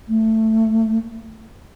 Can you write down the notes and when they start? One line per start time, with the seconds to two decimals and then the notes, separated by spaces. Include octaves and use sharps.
0.08 A3